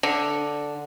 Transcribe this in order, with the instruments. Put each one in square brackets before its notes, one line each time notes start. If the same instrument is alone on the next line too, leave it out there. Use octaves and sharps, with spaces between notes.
[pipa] D3